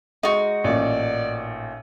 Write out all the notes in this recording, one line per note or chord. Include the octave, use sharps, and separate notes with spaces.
G#3 D#4 F#4
A1 A#2 D5